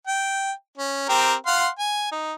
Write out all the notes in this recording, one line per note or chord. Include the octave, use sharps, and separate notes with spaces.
G5
C#4
C4 G4 A#4
F5 F#5 C6
G#5
D#4